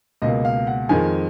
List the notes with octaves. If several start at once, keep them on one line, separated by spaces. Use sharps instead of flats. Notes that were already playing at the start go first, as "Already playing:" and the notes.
C#2 B2 A#3 D#5
F5
F#5
F2 D#3 G#3 G#5